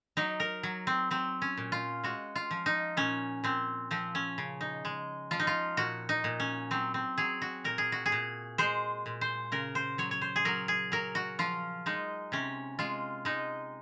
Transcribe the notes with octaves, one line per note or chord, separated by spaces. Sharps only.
F#3 D#4
A#4
F#3
C4
F#3 C4
C#4
A#2
F4
G#3 F#4
F4
F3
D#4
A#2 C#4
A#2 C4
F3 C4
C#4
C#3
D#4
G#3
F3 F4
D#4
F4
A#2 F#4
D#4
A#2
C#4
F#3 C4
C4
F#3 G#4
F#4
A#2 A#4
G#4
F#4
G#4
A#2
G#3 C5
A#2
C5
C#3 A#4
C5
F#3 C#5
C#5
C5
G#4
F#3 A#4
G#4
F#3 A#4
F#4
F3 F4
G#3 D#4
C3 C#4
G#3 F4
G#3 D#4